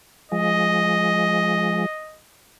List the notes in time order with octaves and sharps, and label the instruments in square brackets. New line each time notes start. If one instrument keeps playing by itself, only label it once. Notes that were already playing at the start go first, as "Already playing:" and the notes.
[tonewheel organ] F3 G#3 [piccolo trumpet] D#5